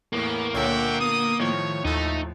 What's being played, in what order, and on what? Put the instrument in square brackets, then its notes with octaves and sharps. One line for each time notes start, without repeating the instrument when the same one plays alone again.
[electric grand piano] E2 A2 [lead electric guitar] A#3 [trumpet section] B3 C#4
[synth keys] C#2 C#5 C#6 [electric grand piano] A#2 D3 [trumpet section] E5 F#5 G5
[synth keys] B3 [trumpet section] D#6
[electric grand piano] A2 F3 [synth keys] D#3 [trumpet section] C#5
[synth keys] D#2 G6 [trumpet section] A3 [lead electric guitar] D#4